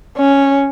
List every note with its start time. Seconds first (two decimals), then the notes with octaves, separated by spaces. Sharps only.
0.18 C#4